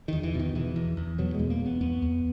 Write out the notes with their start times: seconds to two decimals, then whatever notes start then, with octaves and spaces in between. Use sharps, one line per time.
0.08 E2 D#3
0.23 E3
0.34 B2
0.39 D#3
0.55 E2 E3
0.76 E2
0.97 E2
1.18 B2 F#3
1.34 E2 G#3
1.50 A#3
1.60 E2
1.66 B3
1.81 E2 B3
2.02 E2